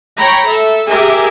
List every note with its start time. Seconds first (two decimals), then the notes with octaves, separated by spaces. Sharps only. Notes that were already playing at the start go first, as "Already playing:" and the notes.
0.16 C#5 G5 A#5 B5
0.46 A4 E5
0.88 G4 G#4 A#4 E5 G#5